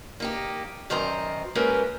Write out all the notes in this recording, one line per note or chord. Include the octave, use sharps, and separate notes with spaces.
A#3 D#4 G4
F#2 D#3 C5 D#5 A#5
G#3 A#3 C#4 G4 A#4 B4